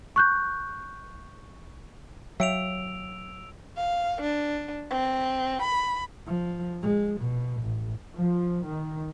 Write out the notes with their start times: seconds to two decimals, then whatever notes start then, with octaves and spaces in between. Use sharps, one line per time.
0.16 C#6 F#6 G6
2.40 F#3 C#5 E5 F5 G5 E6 D7 F7
3.77 F5
4.21 D4
4.91 C4
5.62 B5
6.27 F3
6.83 G#3
7.21 B2
7.62 A1
8.18 F3
8.64 D#3